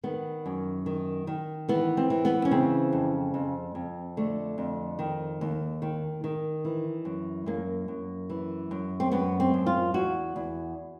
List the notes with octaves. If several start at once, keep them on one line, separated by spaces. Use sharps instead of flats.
D#3 B3
F#2
D#3
D#3
E3 B3
C4
E3
B3
C#4
C#3 C4
F2
F2
F2
D3 A3
F2
D#3
D#2
D#3
D#3
E3
F#2
F#2 A#3
F#2
E3
F#2
C4
F#2 B3
C4
F#2
F4
E2 F#4
E2